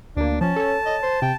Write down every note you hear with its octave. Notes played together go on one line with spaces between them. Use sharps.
D2 A#3 D4
F3 C#4 A5
A4 C#5
D#5
C5
C3 G5